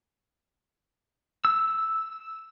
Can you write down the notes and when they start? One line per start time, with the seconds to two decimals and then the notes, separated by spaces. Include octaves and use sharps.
1.45 E6